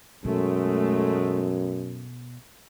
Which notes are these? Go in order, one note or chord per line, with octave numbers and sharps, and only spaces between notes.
F#2 B2 G#3 A3